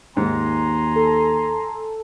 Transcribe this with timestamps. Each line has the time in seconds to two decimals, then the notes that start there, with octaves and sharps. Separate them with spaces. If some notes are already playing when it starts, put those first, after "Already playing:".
0.17 D#2 G#2 G#5 A#5 C6
0.96 A4